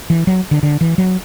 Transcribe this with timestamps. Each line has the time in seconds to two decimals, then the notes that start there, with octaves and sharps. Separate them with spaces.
0.10 E3
0.27 F#3
0.51 D3
0.63 D3
0.81 E3
0.98 F#3